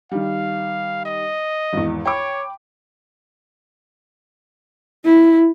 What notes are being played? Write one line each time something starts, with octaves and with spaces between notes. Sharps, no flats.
D#3 G3 F5
D#5
G#1 E2
C#5 G5 B5 D6
E4